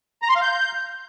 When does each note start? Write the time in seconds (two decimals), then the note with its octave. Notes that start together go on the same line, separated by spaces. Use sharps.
0.22 A#5
0.29 C6
0.35 F5
0.42 G6